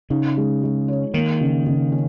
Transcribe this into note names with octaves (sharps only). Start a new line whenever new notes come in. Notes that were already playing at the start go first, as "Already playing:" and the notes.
C#3 D#4
G#3
G#3
C#5
D#3 A#3
C#3
C#3
C#4